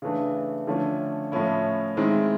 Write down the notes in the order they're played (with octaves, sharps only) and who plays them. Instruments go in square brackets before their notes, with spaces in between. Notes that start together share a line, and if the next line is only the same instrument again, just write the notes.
[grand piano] C#3 E3 A3 D4
D3 F3 A3 C#4
A2 F3 A3 C#4 E4
D#3 G#3 C4 E4